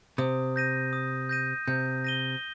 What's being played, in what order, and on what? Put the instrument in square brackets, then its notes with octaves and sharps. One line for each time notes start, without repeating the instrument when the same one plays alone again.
[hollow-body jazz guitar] C3 [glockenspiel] D#6
[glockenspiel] G6 A#6 D#7
D#6
G6 A#6 D#7
[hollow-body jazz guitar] C3 [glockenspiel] G6
[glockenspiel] A#6 D#7 G7